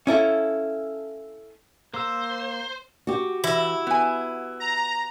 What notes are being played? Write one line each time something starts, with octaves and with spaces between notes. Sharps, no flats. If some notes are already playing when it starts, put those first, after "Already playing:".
C#4 E4 A4 F5
A#3 C5 E6
F#4 G4
E3 E4
B3 G#5
A#5